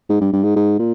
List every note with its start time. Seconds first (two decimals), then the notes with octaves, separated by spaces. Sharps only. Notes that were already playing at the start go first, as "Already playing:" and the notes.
0.10 G#2
0.21 G2
0.33 G2
0.44 G#2
0.56 G#2
0.79 A#2